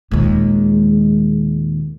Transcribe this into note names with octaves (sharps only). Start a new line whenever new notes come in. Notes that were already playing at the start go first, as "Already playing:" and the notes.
D#2 A#2 G#3